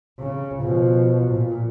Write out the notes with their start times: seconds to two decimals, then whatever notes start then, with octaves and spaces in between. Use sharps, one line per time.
0.19 C#3
0.63 B2 F3
1.31 A#2